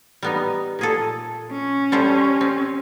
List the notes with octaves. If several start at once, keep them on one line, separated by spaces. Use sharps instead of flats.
G3 B3 D#4
A#2 G#4 A4
C#4
G3 A4 C5
C4